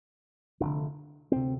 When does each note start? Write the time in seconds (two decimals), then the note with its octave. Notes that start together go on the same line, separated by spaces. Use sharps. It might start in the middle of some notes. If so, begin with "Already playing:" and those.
0.60 F1 F2 D3 D4
1.32 D2 C3 C4